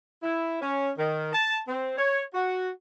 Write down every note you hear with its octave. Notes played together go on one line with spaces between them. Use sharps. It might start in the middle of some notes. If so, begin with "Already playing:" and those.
E4
C#4
D#3
A5
C4
C#5
F#4